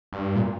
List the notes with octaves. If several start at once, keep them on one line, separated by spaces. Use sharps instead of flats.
G2
A#2